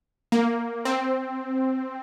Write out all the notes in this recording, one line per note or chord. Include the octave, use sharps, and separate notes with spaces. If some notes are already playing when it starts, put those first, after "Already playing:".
A#3
C4